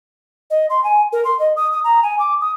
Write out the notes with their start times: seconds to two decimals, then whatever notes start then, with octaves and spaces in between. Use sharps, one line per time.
0.50 D#5
0.70 C6
0.84 G#5
1.13 A#4
1.25 C6
1.39 D#5
1.56 D#6
1.72 D#6
1.84 A#5
2.03 G#5
2.19 D6
2.41 D#6